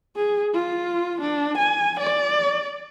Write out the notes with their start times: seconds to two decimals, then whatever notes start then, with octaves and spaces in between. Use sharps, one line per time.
0.16 G#4
0.54 F4
1.21 D4
1.58 G#5
2.00 D5